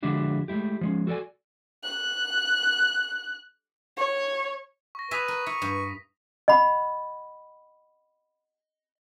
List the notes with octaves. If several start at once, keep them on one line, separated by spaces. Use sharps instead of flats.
D3 F3 G#3 D4 E4 F#4
G#3 A3 E4 G4
F3 G#3 C#4
F#4 A4 A#4 D5 G#5
F#6
C#5
C#6 A#6
B4 E5 G#5 D#6 B6 D#7
A#4
E4 C#6
G2
D#5 F#5 B5